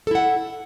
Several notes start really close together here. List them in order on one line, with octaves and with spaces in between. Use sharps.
A4 E4 F#5